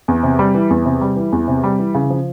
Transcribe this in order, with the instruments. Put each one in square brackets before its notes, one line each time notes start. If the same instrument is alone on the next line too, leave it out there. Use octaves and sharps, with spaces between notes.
[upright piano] E2
C3
G3
E3
E2
C3
G3
E3
E2
C3
G3
E3
C#3
F3